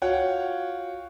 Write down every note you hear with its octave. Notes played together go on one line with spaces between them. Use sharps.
F4 F#4 C#5 F#5 G5